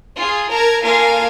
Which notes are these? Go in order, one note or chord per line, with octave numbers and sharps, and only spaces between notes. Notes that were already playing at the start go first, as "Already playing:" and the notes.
F4 G#4
A#4 A5 A#5 G#6
A#3 F4 A4 A#4 F5 G#5